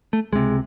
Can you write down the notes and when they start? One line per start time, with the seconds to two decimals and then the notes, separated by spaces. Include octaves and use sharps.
0.13 A3
0.32 C#2 C3 G#3